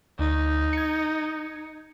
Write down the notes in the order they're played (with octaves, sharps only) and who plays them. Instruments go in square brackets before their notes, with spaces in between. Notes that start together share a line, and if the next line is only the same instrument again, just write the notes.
[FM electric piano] D2 [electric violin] D#4
[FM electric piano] G#6 C#7